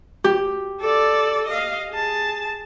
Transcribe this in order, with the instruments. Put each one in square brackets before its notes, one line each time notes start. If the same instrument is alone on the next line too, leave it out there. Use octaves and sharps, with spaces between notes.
[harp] G4
[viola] A4 D5
D#5 F5
G#4 A5